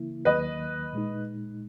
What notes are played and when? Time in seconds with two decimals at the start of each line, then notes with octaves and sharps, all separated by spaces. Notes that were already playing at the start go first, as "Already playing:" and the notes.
Already playing: C#3 E3 A#3 E4
0.25 D#2 D#3 F#3 A#3 B4 D#5
0.93 A#2 G#3 D#4